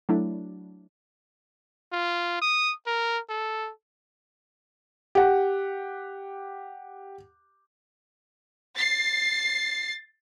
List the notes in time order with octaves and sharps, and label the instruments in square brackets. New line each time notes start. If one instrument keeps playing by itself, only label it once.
[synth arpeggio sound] F#3 A3 D4 E4
[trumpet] F4
D#6
A#4
A4
[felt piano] G4 F#5
[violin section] A6 C7